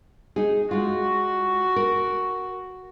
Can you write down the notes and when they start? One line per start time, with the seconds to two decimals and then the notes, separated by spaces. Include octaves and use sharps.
0.36 D#4 G#4
0.71 G#3 F4 F#4
1.76 A#4